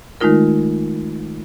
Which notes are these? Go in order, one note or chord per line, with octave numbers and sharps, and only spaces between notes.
D#3 G#3 A3 D#4 F4 A#4